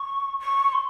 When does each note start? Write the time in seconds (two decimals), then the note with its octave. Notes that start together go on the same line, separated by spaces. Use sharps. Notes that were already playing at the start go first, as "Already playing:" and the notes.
Already playing: C#6
0.40 C#6
0.72 C6